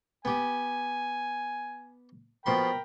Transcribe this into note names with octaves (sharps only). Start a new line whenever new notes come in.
B3 G4 G#5
B2 F3 A#4 G5 B5 C6